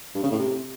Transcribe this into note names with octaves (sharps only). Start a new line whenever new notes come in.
G2
C#3
A2
C3